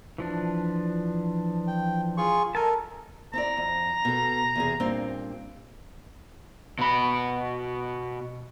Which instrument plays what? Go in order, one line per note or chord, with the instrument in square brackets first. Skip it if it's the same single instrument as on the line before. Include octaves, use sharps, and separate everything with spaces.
[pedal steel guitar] E3 F3 D4
[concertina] G5
F4 G#4 C#6
[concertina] A4 A#4 [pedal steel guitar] D#5 G#5 A5
[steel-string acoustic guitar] C4 E4 D5 [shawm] A#5
[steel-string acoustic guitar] F2
B2 A4
E2 C3 G#4
G2 A#2 C4
[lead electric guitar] B2 B5